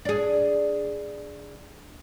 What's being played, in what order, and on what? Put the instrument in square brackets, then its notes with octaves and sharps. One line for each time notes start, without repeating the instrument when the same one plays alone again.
[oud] D4 G#4